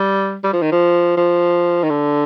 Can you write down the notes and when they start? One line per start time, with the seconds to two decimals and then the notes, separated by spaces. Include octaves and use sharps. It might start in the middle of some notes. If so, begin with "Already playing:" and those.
Already playing: G3
0.44 G3
0.53 F3
0.62 D#3
0.72 F3
1.17 F3
1.83 D#3
1.89 D3